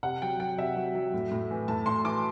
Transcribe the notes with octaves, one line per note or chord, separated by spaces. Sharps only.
C3 F#5
F#3 G5
F#3 G5
C3 E5
F#3
F#3
A2
A2
E3
A2 A5
A2 C6
E3 D6